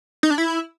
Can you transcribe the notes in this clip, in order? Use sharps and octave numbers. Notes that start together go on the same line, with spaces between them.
D#4
D4
E4